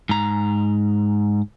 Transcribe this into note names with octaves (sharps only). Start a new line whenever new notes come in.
G#2 A#5